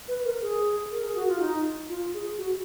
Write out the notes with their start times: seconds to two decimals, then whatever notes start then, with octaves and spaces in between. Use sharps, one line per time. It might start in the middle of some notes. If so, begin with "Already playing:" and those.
0.08 B4
0.25 A#4
0.42 G#4
0.91 A#4
1.03 G#4
1.15 F#4
1.28 F4
1.40 D#4
1.89 F4
2.14 G#4
2.38 F#4